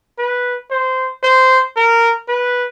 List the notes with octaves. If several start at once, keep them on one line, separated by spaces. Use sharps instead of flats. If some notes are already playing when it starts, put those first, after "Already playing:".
B4
C5
C5
A#4
B4